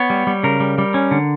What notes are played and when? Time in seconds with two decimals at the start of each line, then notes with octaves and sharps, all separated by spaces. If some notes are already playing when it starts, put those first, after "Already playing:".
Already playing: B3 C#5
0.10 G3
0.27 G3
0.43 C#3 A#4
0.60 G3
0.78 G3
0.94 C#4
1.11 D3